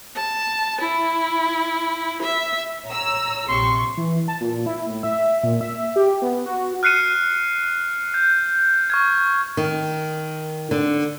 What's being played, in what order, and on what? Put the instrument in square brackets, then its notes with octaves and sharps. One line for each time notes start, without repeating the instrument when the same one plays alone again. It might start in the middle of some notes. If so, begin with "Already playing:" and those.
[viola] A5
E4
E5
[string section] C#5 A#5 E6
[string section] A#1 C3 C#6 [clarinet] C6
[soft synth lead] E3
A5
A#2
E4
A2
E5
A#2
E5
G4
B3
F#4
[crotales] F6 F#6 C7 C#7 D#7
G6
C#6 F6 G#6
[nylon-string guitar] D#3
D3